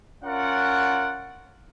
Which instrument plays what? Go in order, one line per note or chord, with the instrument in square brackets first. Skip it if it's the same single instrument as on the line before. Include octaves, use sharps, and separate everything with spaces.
[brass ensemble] C#4 F4 A#4 D5 F#5